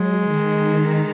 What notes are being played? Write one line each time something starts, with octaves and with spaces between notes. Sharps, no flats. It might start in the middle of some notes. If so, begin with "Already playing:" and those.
Already playing: F#3 G#3
D#3